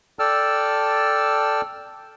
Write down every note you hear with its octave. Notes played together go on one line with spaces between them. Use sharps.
A4 D5 G5 A5 E6 F6